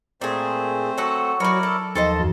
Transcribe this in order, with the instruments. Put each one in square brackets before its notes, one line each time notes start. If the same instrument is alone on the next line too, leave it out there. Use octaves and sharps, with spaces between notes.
[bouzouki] A#2 G#4 [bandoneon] A3 C4 C5
[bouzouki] F#3 A4 F#5
[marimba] F#3 [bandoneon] E4 A#4 D5 [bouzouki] F#4 C#5
[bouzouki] A4
[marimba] D#2 F3 [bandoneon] D#3 A#3 [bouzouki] A4 C5 D#5
[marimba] F#2 E3